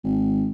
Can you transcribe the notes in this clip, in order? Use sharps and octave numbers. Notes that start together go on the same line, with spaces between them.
G#1